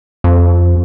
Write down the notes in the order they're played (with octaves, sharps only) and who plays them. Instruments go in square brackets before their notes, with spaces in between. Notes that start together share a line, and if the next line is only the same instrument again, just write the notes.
[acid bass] F2